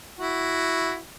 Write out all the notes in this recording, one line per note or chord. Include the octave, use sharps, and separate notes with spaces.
E4 F#4